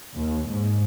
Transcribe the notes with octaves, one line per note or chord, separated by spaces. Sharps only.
D#2
G#2